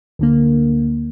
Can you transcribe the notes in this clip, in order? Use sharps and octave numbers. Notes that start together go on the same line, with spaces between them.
D2 D3 A#3